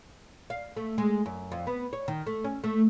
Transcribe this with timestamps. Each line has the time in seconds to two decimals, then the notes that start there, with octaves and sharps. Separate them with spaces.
0.50 F5
0.76 A3
0.98 G#3
1.26 F#2
1.52 F2
1.67 B3
1.93 C#5
2.08 D#3
2.26 A3
2.44 C#4
2.64 A3